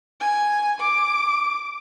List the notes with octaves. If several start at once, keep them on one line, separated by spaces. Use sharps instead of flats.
G#5
D6